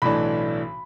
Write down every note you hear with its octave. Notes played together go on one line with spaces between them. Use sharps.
B1 A2 E3 A3 D4 B5